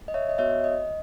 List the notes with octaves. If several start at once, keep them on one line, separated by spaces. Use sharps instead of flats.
D#5
C#5 E5
D#5
B3 F#4 C#5 E5
D#5